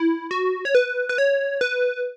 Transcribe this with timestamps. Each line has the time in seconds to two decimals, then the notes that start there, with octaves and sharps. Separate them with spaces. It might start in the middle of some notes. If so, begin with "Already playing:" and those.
Already playing: E4
0.31 F#4
0.65 C#5
0.75 B4
1.09 B4
1.18 C#5
1.61 B4